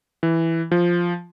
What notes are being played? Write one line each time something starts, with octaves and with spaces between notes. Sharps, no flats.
E3
F3